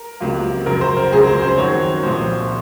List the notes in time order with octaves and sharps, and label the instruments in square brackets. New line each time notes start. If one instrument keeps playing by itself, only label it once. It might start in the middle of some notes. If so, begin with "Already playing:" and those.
Already playing: [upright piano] A#4
[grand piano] C#2 C3 F#3 A#3 F4
[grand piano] F#2 C#3 F#3 [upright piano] A#4
[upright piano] C5
A#4
[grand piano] C#2 C#3 F#3 C4 [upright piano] G#4
[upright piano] C5
C5
[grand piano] F#2 D#3 F#3 C4 F#4 [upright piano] C#5
[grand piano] C2 A#2 F3 [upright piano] C5